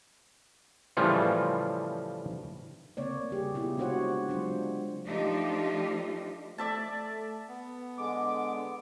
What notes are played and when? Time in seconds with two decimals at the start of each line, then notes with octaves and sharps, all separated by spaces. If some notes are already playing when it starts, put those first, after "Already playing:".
0.97 A2 C#3 E3 F3 G3 F4
2.97 C#3 A#3 C4 C#5 D5
3.31 G3 G4 G#4
3.54 B3 E4 F4 G4 G#4
3.78 G#3 D4 F#4 C5 C#5 F#5
4.29 F#3 G#3 D4 F4 C5
5.06 F3 A3 D4 D#4 G4
6.58 A3 D5 E5 A5
7.48 B3
7.98 D3 G#3 D6